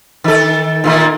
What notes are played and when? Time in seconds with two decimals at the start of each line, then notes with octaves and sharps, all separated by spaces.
0.24 D#3 A4
0.84 A#2 D#3 A#3